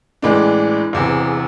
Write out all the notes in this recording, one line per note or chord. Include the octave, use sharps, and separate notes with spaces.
A1 A2 E3 G#3 D4
E1 E2 C3 E3